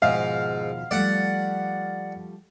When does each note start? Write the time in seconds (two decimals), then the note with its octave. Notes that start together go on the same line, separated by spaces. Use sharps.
0.02 D#2 G#2 B2 F3 F5
0.91 F3 G3 A3 D5 F#5